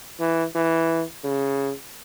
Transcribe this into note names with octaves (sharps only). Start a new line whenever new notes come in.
E3
E3
C#3